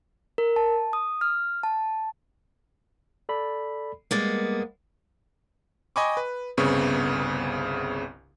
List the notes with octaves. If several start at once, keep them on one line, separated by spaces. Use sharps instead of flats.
A#4
A5
D#6
F6
A5
A4 D5 B5
G3 G#3 A#3 B3 D6 A6
D#5 G5 G#5 B5 C#6 D6
B4
G1 C2 C#3 B3 C4 C#6